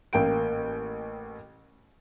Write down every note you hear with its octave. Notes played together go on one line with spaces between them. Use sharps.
A1 A#3 G5 D7